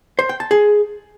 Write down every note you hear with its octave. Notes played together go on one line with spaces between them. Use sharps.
C5
G5
A5
G#4